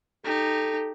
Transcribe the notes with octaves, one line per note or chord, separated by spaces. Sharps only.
D#4 G4 A4